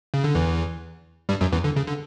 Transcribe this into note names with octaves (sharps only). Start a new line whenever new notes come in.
C#3
D3
E2 E3
G2 G3
F#2 F#3
E2 E3
D3
C#3
D3